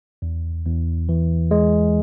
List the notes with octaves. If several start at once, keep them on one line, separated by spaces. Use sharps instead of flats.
E2
E2
E3
G#3